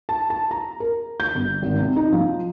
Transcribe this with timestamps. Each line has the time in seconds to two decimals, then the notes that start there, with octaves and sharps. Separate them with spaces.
0.09 A5
0.30 A5
0.51 A#5
0.80 A#4
1.20 G6
1.35 G1
1.62 G#1
1.79 C3
1.96 D#4
2.12 F3